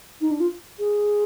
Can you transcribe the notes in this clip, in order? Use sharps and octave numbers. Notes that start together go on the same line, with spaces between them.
D#4
D4
F4
G#4